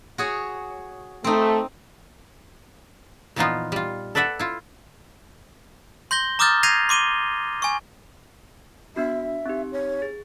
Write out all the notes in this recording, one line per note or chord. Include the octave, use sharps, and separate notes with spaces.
F#4 G#4 C#5
A3 C4 D#4
A#2 E3 F3 B3 D#4 F4
G3 F4
A4 B4 D5 E5 F#5
E4 F4
C6 G6 A#6 G7
A#5 D6 D#6 F6 G6 A6
G6 G#6 A#6 C7 D#7 F7
C6 D6 D#7 G7
G#5 C#6
B3 D4 F#4 E5
C4 D#4 G4
C#5
G#4